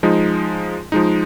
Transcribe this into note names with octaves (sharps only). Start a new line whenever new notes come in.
F3 G#3 D#4
F3 G#3 D#4